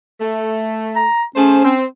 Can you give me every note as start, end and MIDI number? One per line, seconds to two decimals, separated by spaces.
0.21 1.05 57
0.96 1.23 82
1.36 1.62 57
1.36 1.72 61
1.36 1.62 68
1.36 1.62 72
1.64 1.84 60